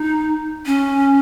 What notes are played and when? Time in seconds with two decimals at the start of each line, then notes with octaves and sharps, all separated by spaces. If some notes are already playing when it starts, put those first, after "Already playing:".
Already playing: D#4
0.66 C#4